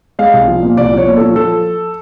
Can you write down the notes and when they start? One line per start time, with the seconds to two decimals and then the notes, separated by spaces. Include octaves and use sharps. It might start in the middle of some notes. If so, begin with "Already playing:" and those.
0.19 G#3 F5
0.33 C2
0.48 F3
0.63 A#2
0.77 C2 D5
0.93 F3 C#5
1.07 A#2
1.17 F3 A4
1.36 F3 A4